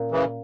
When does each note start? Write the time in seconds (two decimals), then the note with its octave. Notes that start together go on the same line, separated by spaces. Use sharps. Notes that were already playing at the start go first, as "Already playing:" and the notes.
Already playing: A#2 A#3 C#4
0.11 C#3 E3